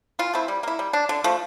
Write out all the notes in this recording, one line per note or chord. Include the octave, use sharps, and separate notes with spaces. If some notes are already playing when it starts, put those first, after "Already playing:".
E3 F4
A3 C4 E4
G3
A#3 E4
G3
D4
D3
F3 A3